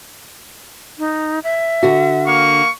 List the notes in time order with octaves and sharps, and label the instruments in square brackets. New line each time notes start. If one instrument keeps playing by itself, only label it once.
[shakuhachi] D#4
E5
[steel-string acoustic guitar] D3 F#4
[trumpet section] A#3 F5 C#6